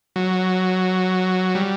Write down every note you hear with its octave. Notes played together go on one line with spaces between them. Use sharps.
F#3
G3